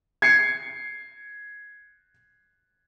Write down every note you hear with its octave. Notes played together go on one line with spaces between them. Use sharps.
G#6 C7 C#7